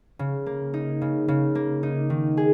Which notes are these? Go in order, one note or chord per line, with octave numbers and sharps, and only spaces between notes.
C#3
A#3
D#4
C#3
C#3
A#3
D#4
D#3
G#4